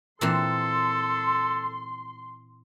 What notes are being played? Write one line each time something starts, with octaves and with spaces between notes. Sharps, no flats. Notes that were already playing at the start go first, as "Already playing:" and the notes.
A#2 E3 C4 A4 C6